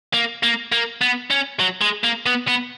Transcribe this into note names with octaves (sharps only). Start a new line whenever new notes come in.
A#3
A#3
A#3
B3
C#4
F#3
G#3
A#3
B3
B3